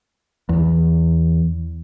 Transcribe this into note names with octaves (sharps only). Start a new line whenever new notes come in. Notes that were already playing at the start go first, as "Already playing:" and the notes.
E2